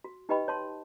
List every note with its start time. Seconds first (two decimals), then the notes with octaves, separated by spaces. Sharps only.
0.04 F#4
0.29 D#4 G4 B4 D#5 G5 B5
0.48 C#5 A5 C6